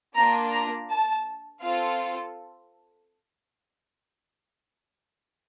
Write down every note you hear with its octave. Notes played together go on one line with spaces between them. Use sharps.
A#3 D4 F4 A#5
A#5
A5
C4 F4 A4 F5